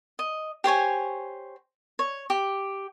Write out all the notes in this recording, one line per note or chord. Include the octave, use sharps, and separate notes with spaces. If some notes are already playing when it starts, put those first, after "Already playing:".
D#5
G4 C5 C#5 G#5
C#5
G4